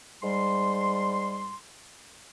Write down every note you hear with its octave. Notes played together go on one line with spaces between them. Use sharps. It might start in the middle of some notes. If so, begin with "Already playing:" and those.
G#2 G3 C6